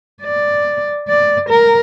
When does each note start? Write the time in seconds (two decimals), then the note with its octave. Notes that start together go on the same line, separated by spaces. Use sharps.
0.23 D5
1.08 D5
1.49 A#4